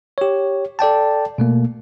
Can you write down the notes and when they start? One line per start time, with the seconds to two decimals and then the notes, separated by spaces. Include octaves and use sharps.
0.18 G4 C#5
0.79 A4 D5 G5 A5
1.38 B2 A3 A#3